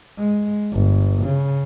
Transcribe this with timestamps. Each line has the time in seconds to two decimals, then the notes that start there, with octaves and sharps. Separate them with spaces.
0.19 G#3
0.72 G1
1.25 C#3